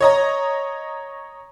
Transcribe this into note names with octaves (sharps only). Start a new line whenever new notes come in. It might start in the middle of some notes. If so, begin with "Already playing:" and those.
C#5 D#5 A#5